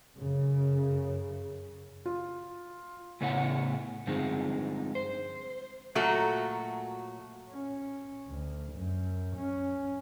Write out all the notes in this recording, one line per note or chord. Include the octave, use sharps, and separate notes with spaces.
F#2 C#3
F4
A2 C#3 B3 E4 C#5 F#5
G2 D3 F3 G#3 C4 D#4
C5
A#2 F#3 A3 F#4
C#4
D2
F#2
C#4